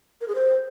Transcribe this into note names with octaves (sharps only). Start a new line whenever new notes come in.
A#4
G#4
C5